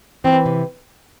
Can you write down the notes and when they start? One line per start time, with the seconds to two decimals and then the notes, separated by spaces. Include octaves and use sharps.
0.24 E3 C4
0.46 C3